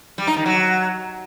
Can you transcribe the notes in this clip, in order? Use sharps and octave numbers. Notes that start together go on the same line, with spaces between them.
G3
D#4
D#3
F#3